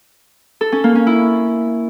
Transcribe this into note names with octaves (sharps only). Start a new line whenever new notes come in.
A4
C#4
A#3
C#4
E4